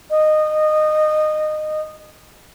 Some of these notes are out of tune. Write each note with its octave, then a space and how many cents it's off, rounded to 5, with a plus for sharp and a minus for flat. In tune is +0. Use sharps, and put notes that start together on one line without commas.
D#5 -20